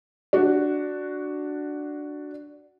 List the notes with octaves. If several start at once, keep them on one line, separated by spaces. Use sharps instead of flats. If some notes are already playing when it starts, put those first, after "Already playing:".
D4 F#4